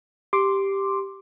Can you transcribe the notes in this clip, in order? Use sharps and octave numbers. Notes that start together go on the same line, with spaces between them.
G4 C6 D6